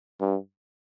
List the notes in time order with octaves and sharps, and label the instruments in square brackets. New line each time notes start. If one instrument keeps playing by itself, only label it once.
[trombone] G2